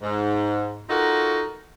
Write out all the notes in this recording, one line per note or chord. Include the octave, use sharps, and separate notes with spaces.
G#2
D#4 F4 F#4 A4 A#4